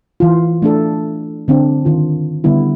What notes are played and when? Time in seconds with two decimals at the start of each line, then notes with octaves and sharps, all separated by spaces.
0.20 E3 F4
0.62 A3 D4 A4
1.48 D3 C4 D4
1.85 D#3 F4
2.44 D3 G3 B3 E4